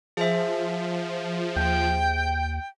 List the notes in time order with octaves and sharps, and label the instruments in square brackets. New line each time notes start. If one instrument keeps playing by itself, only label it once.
[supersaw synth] F3 [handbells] G#4 C5 E5
[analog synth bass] D#2 [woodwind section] G5